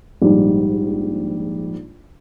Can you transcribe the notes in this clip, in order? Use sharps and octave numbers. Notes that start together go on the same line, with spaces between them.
A#1 G#2 G3